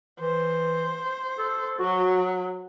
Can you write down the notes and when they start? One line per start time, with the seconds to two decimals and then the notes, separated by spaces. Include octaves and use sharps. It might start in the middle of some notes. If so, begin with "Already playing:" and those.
0.20 E3 C5
1.38 A4
1.79 F#3 F#4